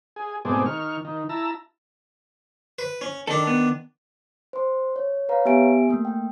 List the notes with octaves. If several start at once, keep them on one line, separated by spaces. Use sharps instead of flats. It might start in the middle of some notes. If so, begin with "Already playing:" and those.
G#4
G#2 B2 A3 C4 G#4 D5
D#3 C#6 F6
D#3
E4 A5 A#5 E6
B4
C#4
D#3 D4 A4
B3
C5 C6
C#5
B4 C#5 F5 A#5
B3 G4 E5 G#5 D7
A3 A#3
G5